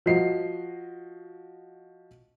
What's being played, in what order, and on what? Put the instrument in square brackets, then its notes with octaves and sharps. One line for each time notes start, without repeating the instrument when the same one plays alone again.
[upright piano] F3 F#4 D#5 C7